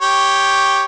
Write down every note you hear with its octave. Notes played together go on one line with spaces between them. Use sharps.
G4 C#5 G5